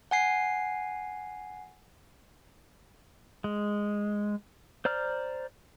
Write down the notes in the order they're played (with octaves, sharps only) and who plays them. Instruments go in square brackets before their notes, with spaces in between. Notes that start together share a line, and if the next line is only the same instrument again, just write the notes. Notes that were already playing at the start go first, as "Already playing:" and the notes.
[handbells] F#5 G#5 C7
[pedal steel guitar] G#3
C5 D5 A#5 F6